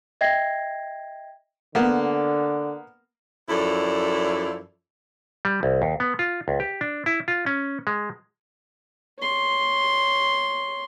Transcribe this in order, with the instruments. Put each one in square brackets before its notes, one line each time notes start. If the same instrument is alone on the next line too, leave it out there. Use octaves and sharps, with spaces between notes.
[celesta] D#5 E5 G5 G#6 A#6 C7
[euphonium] D3 [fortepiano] A#3 B3
[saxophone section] F#2 F3 E4 A4 D5
[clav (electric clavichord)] G3
C2
D#2
B3
F4
C#2
G4
D4
E4
F4
C#4
G#3
[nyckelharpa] C#5 C6